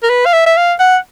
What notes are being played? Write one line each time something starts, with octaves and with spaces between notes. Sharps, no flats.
A#4
B4
F5
E5
E5
F5
F#5